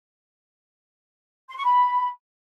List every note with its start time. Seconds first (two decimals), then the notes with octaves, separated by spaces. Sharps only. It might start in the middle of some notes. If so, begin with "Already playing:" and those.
1.49 C6
1.56 C#6
1.64 B5